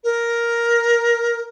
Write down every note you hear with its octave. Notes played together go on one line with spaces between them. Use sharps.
A#4